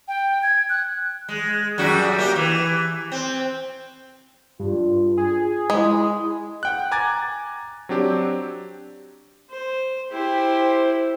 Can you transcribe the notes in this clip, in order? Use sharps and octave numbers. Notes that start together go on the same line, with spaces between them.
G5
G#6
F#6
G#3
F#2 G3 F#4
A#3 G4
E3
C4
G2 F4
G#4
G#3 E4
F#5 G5 F#6
G#5 A#5 D6 G#6 A6
F#3 C4 D4 G4
C5
E4 G4 C5